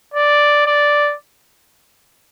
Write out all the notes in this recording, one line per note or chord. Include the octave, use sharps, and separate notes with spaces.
D5
D5